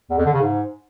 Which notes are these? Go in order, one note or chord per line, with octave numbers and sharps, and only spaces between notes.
E2
F2
D3
C#3
G#2